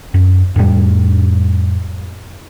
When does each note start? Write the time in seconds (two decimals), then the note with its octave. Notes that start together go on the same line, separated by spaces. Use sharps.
0.14 F#2
0.56 F2 A2 G3